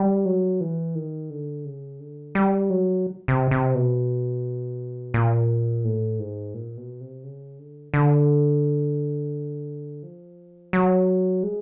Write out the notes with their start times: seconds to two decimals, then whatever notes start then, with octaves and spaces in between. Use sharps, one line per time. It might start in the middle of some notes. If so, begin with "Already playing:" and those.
Already playing: G3
0.25 F#3
0.61 E3
0.95 D#3
1.30 D3
1.65 C#3
2.00 D3
2.35 G3
2.70 F#3
3.28 C3
3.51 C3
3.75 B2
5.14 A#2
5.84 A2
6.19 G#2
6.54 A#2
6.77 B2
7.01 C3
7.24 C#3
7.59 D3
7.94 D3
10.03 F3
10.73 F#3
11.43 G#3